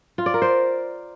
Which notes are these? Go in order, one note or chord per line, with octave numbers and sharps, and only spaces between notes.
F4
D5
A#4
C5